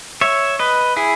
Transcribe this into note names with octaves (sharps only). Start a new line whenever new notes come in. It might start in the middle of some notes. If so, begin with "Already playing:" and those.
C#5 E5
B4 D#5
E4 G#4